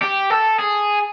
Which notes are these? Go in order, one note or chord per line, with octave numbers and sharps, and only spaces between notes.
G4
A4
G#4